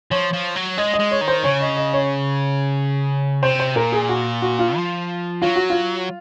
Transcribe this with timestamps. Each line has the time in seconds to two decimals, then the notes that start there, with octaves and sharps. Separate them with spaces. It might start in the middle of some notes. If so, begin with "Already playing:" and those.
0.11 F3 C#5
0.33 F3
0.56 F#3
0.77 G#3 D#5
0.93 D#5
1.00 G#3
1.11 C#5
1.21 D#3
1.28 C5
1.44 C#3 C#5
1.61 D#5
1.77 D#5
1.93 C#5
3.43 C3 C5
3.60 C5
3.76 A#2 A#4
3.92 G#4
4.09 F#4
4.42 F#4
4.59 F4
4.76 F3
5.42 F#3 F4
5.56 F#4
5.70 F4